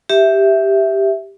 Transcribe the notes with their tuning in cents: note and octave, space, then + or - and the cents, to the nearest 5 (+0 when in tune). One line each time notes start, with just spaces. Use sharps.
G4 +0 E5 +0